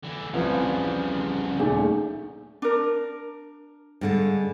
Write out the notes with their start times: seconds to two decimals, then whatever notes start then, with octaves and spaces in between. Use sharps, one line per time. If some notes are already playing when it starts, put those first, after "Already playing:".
0.04 D3 E3
0.33 C2 C#3 E3 F3 G3
1.59 D#1 A#2 A3 D4 D#4 G#4
2.62 D4 A#4
4.01 G2 D3 G#3